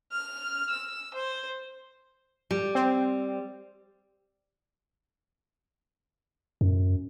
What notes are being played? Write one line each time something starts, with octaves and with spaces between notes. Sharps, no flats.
F6
E6
C5
G3
C4
F#2